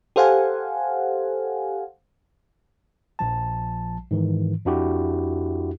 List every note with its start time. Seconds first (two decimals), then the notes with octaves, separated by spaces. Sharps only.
0.16 G4 A4 C5 F5 F#5 G#5
3.19 A#1 F3 A5
4.11 G#2 D#3 E3
4.65 F2 D4 E4 F#4 G4